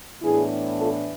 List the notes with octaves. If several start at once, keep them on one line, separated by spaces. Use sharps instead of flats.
A2 E3 B3 D4 E4 G#4
F4 A4